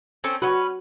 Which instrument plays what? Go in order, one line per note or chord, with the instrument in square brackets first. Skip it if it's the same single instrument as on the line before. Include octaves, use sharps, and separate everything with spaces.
[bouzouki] C4 C#4 A4
[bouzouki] C#4 B4 [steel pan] F#4